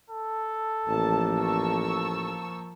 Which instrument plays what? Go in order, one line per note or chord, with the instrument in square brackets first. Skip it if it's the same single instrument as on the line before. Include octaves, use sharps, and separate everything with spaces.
[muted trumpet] A4
[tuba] A1 [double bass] F3 A#3 [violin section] A5
[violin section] A5 C#6 E6